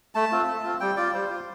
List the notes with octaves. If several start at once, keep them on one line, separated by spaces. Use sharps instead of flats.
A3 A5
C4 F4
A3
C4 F4
G3 G5
F4 D5
G3 C5
F4